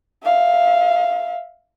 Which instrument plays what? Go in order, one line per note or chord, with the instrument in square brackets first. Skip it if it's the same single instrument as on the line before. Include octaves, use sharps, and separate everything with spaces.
[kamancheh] E5 F5